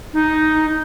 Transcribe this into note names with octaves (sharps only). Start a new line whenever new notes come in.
D#4